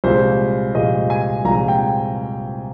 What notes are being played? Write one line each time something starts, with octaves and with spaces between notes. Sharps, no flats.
C2 A#2 F3 G#3 C5
C2 A#2 F3 G#3 D#5
G#5
C2 A#2 F3 G#3 A#5
G5